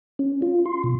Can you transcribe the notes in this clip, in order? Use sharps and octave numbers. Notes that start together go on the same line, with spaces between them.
C#4
F4
C6
B2